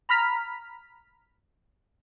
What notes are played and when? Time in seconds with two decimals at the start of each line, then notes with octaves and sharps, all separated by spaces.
0.09 A#5 B5 F6 B6